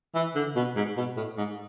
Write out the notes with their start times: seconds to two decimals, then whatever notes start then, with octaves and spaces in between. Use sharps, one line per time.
0.15 E3
0.35 D3
0.56 B2
0.76 G#2
0.97 B2
1.16 A2
1.37 G#2